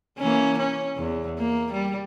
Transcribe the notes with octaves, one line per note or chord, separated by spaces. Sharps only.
E3 A#3 C#4
C#4
E2
A#3
G3